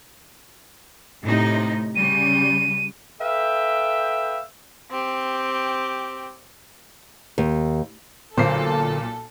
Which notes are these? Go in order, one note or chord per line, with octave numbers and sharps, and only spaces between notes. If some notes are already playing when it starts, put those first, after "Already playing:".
A2 C3 D#4
C#3 G3 D#7
A4 B4 E5 F5 G5
C4 G4
D#2
B1 A#2 D3 A#3 A4 C5 C7